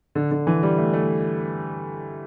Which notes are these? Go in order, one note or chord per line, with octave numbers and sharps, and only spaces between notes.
D3
D3
E3
G3
A3
A3